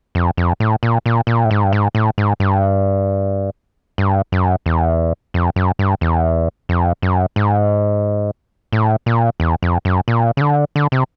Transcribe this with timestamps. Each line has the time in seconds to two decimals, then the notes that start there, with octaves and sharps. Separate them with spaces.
0.15 F2
0.37 F2
0.60 A2
0.83 A#2
1.06 A#2
1.27 A#2
1.45 A2
1.51 G#2
1.64 G2
1.73 G#2
1.95 A2
2.18 G#2
2.40 G2
3.98 G2
4.32 F#2
4.66 E2
5.34 F2
5.56 F#2
5.79 G2
6.01 E2
6.69 F2
7.02 F#2
7.36 G#2
8.73 A2
9.06 A#2
9.40 E2
9.63 F2
9.85 F#2
10.08 A#2
10.37 C#3
10.41 D3
10.76 D3
10.92 C3